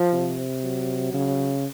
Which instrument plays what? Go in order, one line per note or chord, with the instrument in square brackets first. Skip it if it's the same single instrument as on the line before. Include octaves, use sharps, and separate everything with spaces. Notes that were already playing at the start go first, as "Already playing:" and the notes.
Already playing: [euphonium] F3
[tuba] C3
[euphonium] F#3
[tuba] C#3